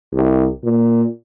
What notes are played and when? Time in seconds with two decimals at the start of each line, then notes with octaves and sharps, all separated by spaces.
0.13 C2
0.64 A#2